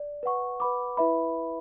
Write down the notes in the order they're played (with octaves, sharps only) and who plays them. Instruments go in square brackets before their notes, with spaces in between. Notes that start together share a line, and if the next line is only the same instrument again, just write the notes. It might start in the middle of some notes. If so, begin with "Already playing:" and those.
Already playing: [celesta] D5
B4 F#5 C#6
B4 F#5 B5 D6
E4 B4 E5 B5